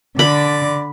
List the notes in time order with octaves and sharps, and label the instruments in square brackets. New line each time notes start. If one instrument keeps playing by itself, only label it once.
[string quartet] D3 [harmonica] D5 [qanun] B5